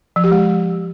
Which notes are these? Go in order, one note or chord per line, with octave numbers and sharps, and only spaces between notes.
F3
G4
G#3